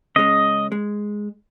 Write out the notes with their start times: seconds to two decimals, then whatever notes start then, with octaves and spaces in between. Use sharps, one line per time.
0.16 C#3 G#3 C#4 D#5
0.72 G#3